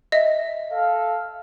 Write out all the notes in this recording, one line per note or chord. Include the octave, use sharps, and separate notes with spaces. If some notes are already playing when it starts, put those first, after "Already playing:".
D#5 E5
A4 F5